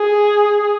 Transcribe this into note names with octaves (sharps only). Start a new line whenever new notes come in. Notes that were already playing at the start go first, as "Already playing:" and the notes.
Already playing: G#4